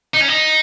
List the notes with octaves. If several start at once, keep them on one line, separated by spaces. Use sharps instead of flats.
D#4
C#4
D#4